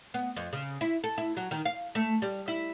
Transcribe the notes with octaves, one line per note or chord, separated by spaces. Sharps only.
B3
F2
C#3
E4
A4
E4
F#3
D#3
F5
A3
G3
E4